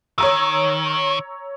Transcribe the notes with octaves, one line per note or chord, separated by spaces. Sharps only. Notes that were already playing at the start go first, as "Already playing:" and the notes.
D#3 C#5 A#5 E6